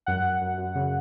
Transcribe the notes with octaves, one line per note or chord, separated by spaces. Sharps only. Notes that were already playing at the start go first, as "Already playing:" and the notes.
F#2 F#5
F#2
F#2
F#2
C#3